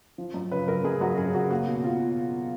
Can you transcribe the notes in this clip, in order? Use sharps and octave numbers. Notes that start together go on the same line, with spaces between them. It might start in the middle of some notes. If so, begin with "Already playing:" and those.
F3
F#2
C#3 B4
F#2 A#4
F#2 G#4
F#2 F#4
F#2 G#4
C#3 F#4
A#3 F#4
B2
B2 F4